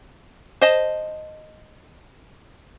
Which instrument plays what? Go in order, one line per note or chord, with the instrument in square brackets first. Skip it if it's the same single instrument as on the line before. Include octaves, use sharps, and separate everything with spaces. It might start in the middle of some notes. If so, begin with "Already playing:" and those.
[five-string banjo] C5 D#5 A5